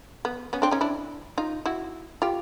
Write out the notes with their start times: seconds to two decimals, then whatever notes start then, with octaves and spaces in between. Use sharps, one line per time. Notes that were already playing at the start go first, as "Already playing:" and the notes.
0.25 B3
0.53 B3 C#4
0.62 C4 D4
0.71 C#4 D#4
0.81 D4 E4
1.38 D#4 F4
1.66 E4 F#4
2.22 F4 G4